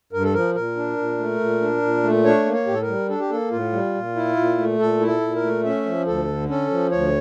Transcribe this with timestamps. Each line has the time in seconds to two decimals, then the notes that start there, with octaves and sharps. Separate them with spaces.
0.12 G2 A#4
0.23 A4
0.34 F3 A#4
0.55 A#2 A#4
0.76 D4
0.97 A#2
1.19 A3
1.40 A#2
1.61 D4
1.82 A#2
2.03 A3
2.25 D4 C#5
2.46 A#3
2.53 C#5
2.66 A2 G4
2.74 A4
2.82 A#4
2.88 G3
3.09 D4 A4
3.20 G4
3.30 A#3 A4
3.51 A2 F4
3.72 G3
3.95 A#2
4.15 E4
4.37 A#2
4.58 A3
4.79 A#2 A4
5.00 E4
5.07 A4
5.21 A#2
5.36 A#4
5.43 A3
5.64 C#4 E5
5.85 F3
6.06 D2 A4
6.28 D3
6.49 C#4 A4
6.70 F3
6.91 D2 C#5